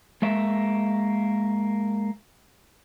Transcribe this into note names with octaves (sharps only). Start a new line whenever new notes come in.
G#3 A#3 E5